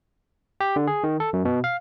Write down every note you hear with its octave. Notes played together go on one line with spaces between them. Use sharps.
G4
D3
G#4
D#3
A4
F#2
B2
F5